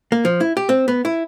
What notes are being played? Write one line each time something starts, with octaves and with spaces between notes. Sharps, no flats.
A#3
F3
E4
G4
C4
B3
E4